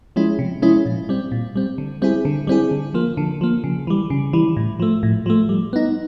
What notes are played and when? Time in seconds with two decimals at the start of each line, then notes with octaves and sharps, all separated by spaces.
0.16 F3 G#3 C#4 E4
0.39 C3
0.62 F3 G#3 C#4 E4
0.86 A#2
1.09 G3 C4
1.32 A#2
1.56 G3 C4
1.78 D3
2.02 G3 C4 E4 G#4
2.25 D3
2.47 G3 C4 E4 G#4
2.71 D3
2.94 F3 A#3
3.17 D3
3.41 F3 A#3
3.64 C#3
3.87 E3 G3
4.10 C#3
4.33 E3 G3
4.57 A2
4.80 F3 A3
5.03 A2
5.26 F3 A3
5.49 G3
5.73 B3 D#4